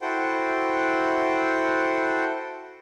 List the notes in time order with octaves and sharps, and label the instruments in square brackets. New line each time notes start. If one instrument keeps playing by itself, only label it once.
[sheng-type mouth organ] E4 F#4 A4 C5 F#5 G5